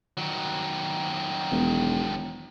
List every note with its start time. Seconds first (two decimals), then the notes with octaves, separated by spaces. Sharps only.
0.17 D#3 F#3
1.51 E1